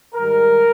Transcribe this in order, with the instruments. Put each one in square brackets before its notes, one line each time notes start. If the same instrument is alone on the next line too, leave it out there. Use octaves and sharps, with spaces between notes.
[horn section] G#2 D#3 G3 A#4